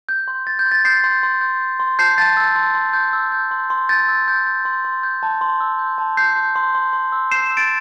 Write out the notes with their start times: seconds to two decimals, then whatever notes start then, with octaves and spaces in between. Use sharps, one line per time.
0.09 G6
0.28 C6
0.47 C6 A6
0.59 G6
0.66 C6
0.71 A6
0.85 C6 G6 C7
1.04 C6
1.23 C6
1.41 G6
1.61 G6
1.80 C6
1.99 A5 G6 C7
2.18 A5 A6
2.37 E6
2.56 C6
2.75 C6
2.93 G6
3.13 E6
3.32 G6
3.51 C6
3.70 C6
3.89 G6 A6
4.08 E6
4.28 G6
4.47 G6
4.65 C6
4.85 C6
5.03 G6
5.23 A5
5.41 C6
5.60 E6
5.79 G6
5.98 A5
6.17 E6 G6 C7
6.36 C6
6.56 C6
6.75 C6
6.93 C6
7.12 E6
7.31 G6 C7 E7
7.51 E6
7.57 A6 D7